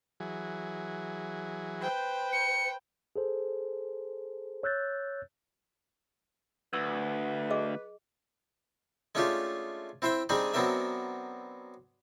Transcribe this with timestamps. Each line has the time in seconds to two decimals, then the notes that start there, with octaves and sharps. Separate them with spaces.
0.20 E3 F#3 G#4
1.82 B4 C5 G5
2.33 C#7
3.16 G#4 A4 C5
4.63 C#5 E6 F#6 G6 A6
6.73 D2 B4 E6
7.50 G#4 D#5 D6
9.15 G#3 A3 C#4 D4 F4 G4
10.02 C4 E4 C5 E5 G5
10.29 G3 G#3 C4 D4 D#4 G#4
10.54 F#3 B3 C4 D4 A#4 E5